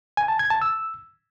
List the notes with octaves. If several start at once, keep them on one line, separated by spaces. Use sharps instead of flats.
G#5
A5
G#6
A5
E6